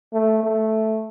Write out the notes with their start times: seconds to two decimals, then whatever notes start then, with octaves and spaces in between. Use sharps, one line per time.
0.14 A3
0.44 A3